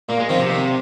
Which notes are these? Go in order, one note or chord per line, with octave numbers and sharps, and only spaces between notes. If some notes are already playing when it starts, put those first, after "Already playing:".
A#2 A#3
G#3
D#3 F3 C4
C3
D#3